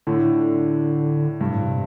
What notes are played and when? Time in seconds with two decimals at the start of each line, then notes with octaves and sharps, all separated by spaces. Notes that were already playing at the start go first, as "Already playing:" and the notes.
0.07 A2 D3
1.41 G2 C3
1.52 A2
1.62 C3